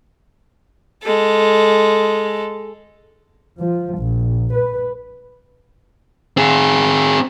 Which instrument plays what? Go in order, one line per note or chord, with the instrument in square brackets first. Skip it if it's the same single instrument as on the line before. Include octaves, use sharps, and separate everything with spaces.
[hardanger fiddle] G#3 A4
[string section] F3
A#1
B4
[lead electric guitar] C4 G#4